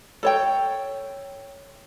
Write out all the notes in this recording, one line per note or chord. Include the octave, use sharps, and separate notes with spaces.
A4 C#5 G5